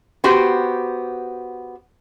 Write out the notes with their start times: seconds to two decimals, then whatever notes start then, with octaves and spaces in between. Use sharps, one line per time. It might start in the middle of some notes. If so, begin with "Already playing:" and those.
0.24 B3 F#4 G4 C5